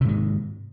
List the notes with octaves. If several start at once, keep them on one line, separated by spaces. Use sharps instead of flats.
G#2 C3 D#3